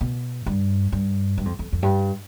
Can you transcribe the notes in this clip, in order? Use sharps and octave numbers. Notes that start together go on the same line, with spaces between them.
B2
G2
G2
G2
F2
F2
F2
G2